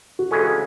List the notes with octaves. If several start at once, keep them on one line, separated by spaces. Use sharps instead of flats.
F#4
D2 C#3 E3 G#3 C#4 A4